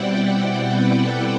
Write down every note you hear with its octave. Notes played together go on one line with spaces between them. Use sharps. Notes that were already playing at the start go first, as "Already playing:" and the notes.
Already playing: B2 G3 C4 E4 D5 F#5 G5
D5
B4
A4